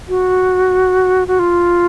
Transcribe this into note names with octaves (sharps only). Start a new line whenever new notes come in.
F#4
F#4
F4